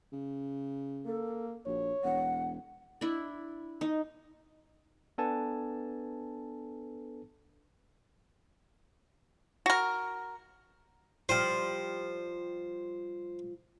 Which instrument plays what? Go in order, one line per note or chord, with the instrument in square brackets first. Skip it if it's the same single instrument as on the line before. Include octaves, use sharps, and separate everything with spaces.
[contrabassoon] C#3
[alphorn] A#3 [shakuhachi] A4
[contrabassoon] A#1 [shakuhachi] F#4 [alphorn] C#5
[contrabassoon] E1 [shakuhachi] F#5
[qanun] D4 E4
D#4
[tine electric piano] B3 D4 A4 B4 G#5 A5
[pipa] F#4 A#4
[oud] F3 G3 F4 [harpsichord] C5